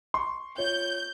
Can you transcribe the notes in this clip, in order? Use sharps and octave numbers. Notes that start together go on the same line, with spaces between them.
C6 C#6
F4 C#5 G6